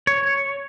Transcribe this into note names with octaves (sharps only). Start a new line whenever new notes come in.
C#5